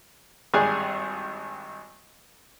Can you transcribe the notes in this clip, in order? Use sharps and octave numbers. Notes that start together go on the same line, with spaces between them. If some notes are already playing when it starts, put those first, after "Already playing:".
G#1 G2 G3 G#4 G#5 F#6